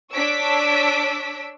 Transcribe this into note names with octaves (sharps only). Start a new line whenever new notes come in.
D4 C#5 E6 B6 D7